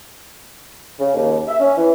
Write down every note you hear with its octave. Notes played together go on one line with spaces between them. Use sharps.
C#3
D#2
E5
C#4
E3